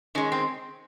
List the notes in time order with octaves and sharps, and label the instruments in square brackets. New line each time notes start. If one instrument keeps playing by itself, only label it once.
[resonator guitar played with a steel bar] D#3 G#3 C#4
C4